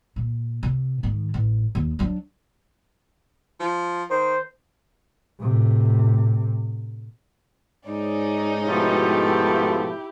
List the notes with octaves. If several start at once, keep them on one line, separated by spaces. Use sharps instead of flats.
A#2
C3
G#2 D#3
A1
D#2
F#3 D4
F3
D#3 C5
A2 C3
G#2 C#4 D#4 D5
B2 F3 A3 E4 G4